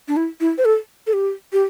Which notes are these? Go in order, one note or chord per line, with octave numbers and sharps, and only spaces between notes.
D4
E4
E4
C5
A4
A4
G4
G4